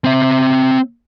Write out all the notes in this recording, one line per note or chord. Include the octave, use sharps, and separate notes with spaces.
C4 E5